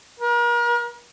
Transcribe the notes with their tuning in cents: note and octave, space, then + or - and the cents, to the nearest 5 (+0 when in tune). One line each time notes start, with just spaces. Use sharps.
A#4 +40